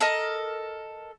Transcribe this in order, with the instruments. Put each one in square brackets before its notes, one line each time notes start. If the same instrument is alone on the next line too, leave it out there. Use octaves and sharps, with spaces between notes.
[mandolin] A4 A#4 D#5